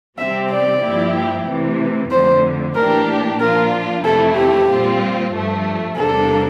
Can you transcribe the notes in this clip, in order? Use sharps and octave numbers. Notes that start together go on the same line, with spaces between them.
C3 G3 C4 G4 E5
D5
G2 F3 A#3 E4 G4
C3 E3 A3
F2 D3 A3 C5
A2 E3 A#3 D4 G4 A#4
A#2 F3 A#3 D4 F4 A#4
F2 C3 E3 A3 E4 A4
G4
A#2 G3 C4 F4
G2 F3 A3
E2 C3 G3 A#3 D4 A4